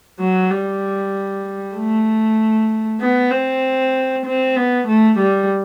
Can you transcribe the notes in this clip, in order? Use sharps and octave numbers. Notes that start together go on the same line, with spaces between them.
F#3
G3
A3
B3
C4
C4
B3
A3
G3